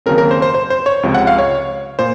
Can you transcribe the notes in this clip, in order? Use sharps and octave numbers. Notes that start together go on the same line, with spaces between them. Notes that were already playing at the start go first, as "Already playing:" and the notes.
D#2 C#3 F#3 C4 A#4
A#4
C5
C5
C5
C5
C#5
C#2 C3 F3
F#5
F5
C#5
A#2 C5